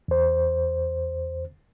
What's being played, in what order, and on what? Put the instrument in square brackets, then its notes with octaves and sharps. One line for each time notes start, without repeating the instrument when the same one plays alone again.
[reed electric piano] E2 C5